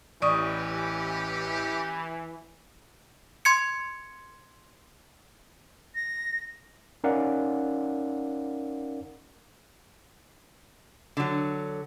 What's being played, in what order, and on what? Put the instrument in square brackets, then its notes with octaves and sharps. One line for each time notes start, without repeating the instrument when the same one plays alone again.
[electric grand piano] A1 D#7 [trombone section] E3 [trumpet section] C#4 G4 [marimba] D5 C#6 D#6
[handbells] C6 G#6 C#7
[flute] A#6
[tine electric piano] C#4 D#4 A#4 D5 F5 F#5
[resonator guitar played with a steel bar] D3 F#3